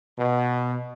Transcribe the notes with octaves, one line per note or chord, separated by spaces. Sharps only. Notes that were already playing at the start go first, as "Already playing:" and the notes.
B2